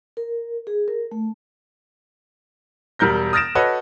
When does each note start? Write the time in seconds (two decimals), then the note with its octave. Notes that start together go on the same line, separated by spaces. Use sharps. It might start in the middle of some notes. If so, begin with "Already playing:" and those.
0.17 A#4
0.67 G#4
0.88 A#4
1.12 A3
2.99 E1 G3 A#4 G6 A#6
3.33 D#6 F6 A6 A#6 D7 E7
3.55 F#4 A4 B4 C#5 D#5